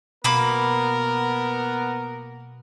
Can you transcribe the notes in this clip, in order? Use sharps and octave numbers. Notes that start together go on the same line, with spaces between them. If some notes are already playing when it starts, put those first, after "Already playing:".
B2 A#3 B3 A#4 B5 D6